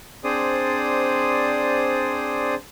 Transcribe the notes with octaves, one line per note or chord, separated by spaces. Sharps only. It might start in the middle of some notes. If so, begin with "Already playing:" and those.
C4 D4 G#4 C5 D5 D#6